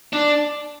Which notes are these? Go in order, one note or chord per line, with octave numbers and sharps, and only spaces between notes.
D4